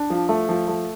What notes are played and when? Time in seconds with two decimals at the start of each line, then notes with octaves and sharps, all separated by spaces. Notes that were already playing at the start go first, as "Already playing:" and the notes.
Already playing: D4
0.10 F3
0.29 A3
0.49 F3
0.68 A3